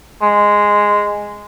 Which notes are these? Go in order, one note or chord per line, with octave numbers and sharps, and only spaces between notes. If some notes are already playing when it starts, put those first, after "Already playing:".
G#3